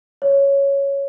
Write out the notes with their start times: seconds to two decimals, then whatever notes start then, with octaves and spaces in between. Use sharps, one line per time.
0.22 C#5